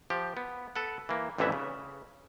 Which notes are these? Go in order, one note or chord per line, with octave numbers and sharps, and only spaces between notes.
F3 G4
B3
A4 B4 F#5
E3 A#3
A1 F2 D3 E3 B3 E5
C#3